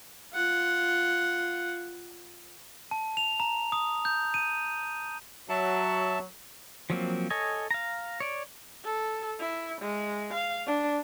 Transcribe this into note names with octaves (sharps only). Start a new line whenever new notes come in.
F4 F#5
A5
F7
A#5
D#6
G6
D#7
F#3 E5 A5
F3 F#3 A#3 C4
A4 C#5 D#5 G#5
F5 A#5
C#5 D5
A4
E4
G#3
F5
D4